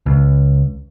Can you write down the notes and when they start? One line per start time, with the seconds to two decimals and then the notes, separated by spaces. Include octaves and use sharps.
0.06 C#2